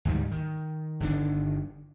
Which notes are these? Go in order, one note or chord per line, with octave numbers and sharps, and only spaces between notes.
D2 G#2 D#3 G3
D#3
G1 D3 D#3 D4